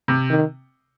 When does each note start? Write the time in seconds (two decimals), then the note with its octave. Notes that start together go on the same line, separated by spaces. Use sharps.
0.08 C3
0.30 D#3